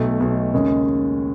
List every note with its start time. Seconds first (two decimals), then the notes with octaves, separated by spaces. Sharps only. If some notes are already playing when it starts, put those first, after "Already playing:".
Already playing: B1 B2 A3
0.20 B1 B2 A3
0.54 D#2 C#3 G#3 C#4